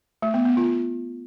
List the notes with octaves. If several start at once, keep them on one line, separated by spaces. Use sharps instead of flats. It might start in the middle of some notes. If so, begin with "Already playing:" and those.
A3
B3
B3
F4